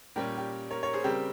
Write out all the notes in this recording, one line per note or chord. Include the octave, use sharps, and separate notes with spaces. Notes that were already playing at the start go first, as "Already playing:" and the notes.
A#2 G3 C#4 G4 A#4
G4
A#4 C#5
A#4 C#5
G#4 C5
C#3 G3 C4 G4 A#4